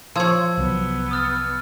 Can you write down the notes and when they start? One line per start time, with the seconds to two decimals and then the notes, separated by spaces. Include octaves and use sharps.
0.16 F3 C#5 A5 E6 G#6
0.58 C2 F#3 B3
1.11 D#6 F6 A6